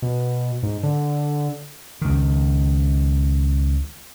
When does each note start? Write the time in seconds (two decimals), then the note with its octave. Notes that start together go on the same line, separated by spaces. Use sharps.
0.02 B2
0.63 G#2
0.83 D3
2.02 C#2 D#3